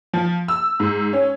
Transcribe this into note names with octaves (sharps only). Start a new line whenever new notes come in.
F3
E6
G#2
C#4